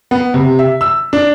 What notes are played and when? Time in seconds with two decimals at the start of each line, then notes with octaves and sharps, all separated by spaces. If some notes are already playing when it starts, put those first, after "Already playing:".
0.11 B3
0.34 C3
0.59 E5
0.81 E6
1.13 D4